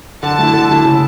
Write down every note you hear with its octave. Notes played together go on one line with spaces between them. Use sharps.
D3 A5
A3 E4
D3
A3 E4
C#3